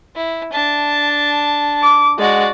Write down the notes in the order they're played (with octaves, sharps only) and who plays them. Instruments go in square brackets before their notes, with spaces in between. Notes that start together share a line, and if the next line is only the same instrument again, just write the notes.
[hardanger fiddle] E4
D4 A5
[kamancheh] D6
[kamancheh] G#3 F#5 [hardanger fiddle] F#4 D5